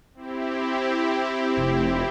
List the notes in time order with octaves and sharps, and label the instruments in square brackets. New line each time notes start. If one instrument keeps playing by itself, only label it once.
[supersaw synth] C4 E4 G4
[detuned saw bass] F1